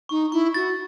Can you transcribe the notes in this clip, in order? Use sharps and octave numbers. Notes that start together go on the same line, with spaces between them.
D#4 C#6
E4 C#6
F#4 A6